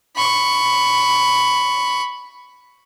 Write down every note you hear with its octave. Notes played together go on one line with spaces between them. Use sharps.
B5 C#6